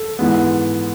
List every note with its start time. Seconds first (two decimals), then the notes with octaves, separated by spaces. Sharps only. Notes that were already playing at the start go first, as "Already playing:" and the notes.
Already playing: A4
0.19 G#2 E3 G#3 B3